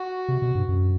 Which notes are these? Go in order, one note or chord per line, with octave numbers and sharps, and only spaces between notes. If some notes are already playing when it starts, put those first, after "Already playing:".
Already playing: F#4
C3
B2
G2
F#2